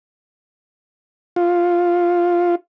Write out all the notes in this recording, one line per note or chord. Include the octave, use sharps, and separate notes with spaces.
F4